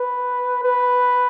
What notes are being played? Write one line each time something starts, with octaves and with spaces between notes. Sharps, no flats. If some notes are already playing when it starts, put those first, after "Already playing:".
Already playing: B4
B4